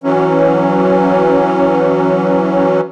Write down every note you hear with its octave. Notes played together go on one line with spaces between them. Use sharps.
E3 F#3 C#4